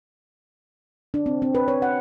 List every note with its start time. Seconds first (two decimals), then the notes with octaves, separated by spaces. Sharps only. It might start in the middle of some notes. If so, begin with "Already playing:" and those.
1.14 D4
1.26 C4
1.42 C4
1.55 B4
1.68 C#5
1.82 F#5